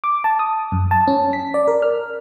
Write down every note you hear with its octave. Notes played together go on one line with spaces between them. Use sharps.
D6
A5
D#6
F#2
A5
C#4
B6
D5
A#4
F6